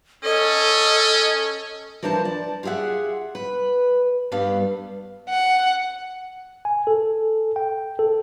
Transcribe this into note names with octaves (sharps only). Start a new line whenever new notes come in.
C#4 A4 D#5
E3 F3 D4 A#4 C5 A5
D5
F4 G4 G#4 E5 F#5
B4
G2 G3 B3 F5
F#5
G#5
A4
G5
A4